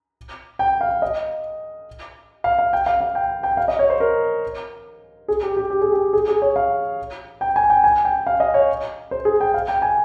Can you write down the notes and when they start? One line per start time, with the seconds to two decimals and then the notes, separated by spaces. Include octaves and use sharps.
0.59 G5
0.81 F5
1.02 D#5
2.44 F5
2.59 F5
2.73 G5
2.86 F5
3.01 F5
3.15 G5
3.43 G5
3.57 F5
3.68 D#5
3.79 C#5
3.90 C5
4.00 A#4
5.28 G#4
5.43 G4
5.57 G4
5.70 G4
5.81 G#4
5.92 G4
6.13 G#4
6.28 G#4
6.42 C#5
6.56 F5
7.41 G5
7.56 G#5
7.70 G5
7.84 G#5
8.05 G5
8.27 F5
8.40 D#5
8.54 C#5
9.11 C5
9.25 G#4
9.40 G5
9.54 F5
9.68 G5
9.82 G#5